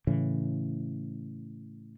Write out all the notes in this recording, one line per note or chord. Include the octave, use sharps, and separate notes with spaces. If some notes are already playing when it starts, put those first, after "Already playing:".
A2 C#3 E3